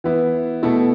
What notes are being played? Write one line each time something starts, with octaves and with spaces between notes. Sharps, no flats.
E3 B3 E4
B2 A3 E4 A4